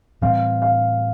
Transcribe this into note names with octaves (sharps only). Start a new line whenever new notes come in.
A2 E3 G3 C4 F5
F5